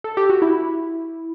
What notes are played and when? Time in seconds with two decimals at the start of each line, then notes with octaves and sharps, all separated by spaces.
0.04 A4
0.17 G4
0.30 F#4
0.42 E4